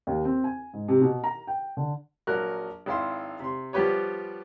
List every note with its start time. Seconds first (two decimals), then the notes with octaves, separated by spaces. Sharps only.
0.07 D#2
0.25 C4
0.44 G#5
0.73 G#2
0.88 C3
1.01 B2
1.24 A#5
1.47 G5
1.77 D3
2.27 A#1 F#3 A#4 F#6
2.86 G#1 E4 F5 C6
3.40 C3 C6
3.73 F3 G3 B3 G4 B4 C#5